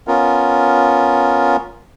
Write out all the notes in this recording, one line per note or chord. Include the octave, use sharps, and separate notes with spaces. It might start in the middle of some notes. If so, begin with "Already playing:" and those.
B3 C#4 F4 A#4